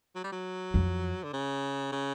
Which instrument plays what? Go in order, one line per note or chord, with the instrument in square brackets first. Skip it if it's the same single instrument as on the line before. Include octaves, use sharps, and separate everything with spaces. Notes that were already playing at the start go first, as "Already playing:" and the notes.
[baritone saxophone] F#3
G3
F#3
[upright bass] F2
[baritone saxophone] D3
C#3
C#3